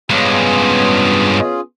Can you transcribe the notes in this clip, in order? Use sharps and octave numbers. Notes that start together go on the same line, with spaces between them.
G2 G#3 B3 C#4 F4 G#4